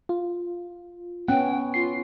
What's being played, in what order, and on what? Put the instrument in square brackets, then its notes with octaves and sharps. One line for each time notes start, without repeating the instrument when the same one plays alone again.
[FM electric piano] F4
[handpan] B3 C#4 [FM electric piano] F#5 [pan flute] G5
[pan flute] F4 [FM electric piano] C7